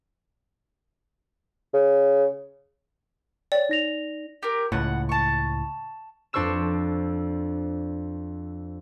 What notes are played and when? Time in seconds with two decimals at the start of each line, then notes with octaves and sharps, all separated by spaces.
1.74 C#3
3.52 C#5 D5 G5
3.69 D#4 A#6 F7
4.43 G4 A#4
4.72 C#2 A2 F#5
5.09 A5 C#6
6.33 F2 D4 C5 C#6 E6 E7